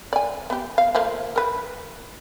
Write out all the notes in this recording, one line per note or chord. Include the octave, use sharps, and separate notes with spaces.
D5 G#5
B3 G4
F5
F3 A3 A#3
A#4 B4